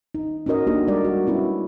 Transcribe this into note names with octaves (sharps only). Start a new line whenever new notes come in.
D#4
C#4 D#4 F#4 A#4 D#5
A#3 D4 D#4 F#4 G4 A4
G3 G#3 A#4 D5
F#4
B3 C#4 E4 F#4